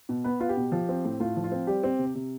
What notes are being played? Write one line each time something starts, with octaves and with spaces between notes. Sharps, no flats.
B2
B3 B4
B3 F4
G4
B2
F3
C4
A2
A2 F4
F3
F4
C4
G3 G4
C4
C3
C3